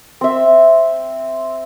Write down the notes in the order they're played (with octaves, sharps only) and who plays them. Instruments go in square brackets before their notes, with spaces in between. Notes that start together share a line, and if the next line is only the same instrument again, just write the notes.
[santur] C4 E5